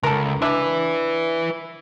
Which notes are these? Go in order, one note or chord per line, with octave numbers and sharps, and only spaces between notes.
C#2 A4 A#4
D4 E4 B4 E5